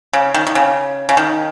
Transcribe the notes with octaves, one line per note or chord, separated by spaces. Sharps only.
C#3
D#3
D#3
C#3
C#3
D#3